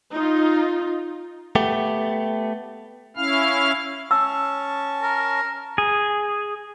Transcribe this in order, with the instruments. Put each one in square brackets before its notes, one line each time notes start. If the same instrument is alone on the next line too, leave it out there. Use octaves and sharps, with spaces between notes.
[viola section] D#4 F4
[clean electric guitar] A3 B3 G4
[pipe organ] C#4 E4 F5 F6
[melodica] C#4 A5 C#6 [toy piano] E6
[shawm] A#4
[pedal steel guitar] G#4